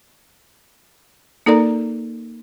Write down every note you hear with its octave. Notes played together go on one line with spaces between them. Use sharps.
A#3 D#4 A4 A#4 D5 A#5